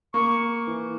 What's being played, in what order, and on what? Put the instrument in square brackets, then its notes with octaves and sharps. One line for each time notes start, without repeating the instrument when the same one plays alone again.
[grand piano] A#3 [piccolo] C#6
[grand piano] E3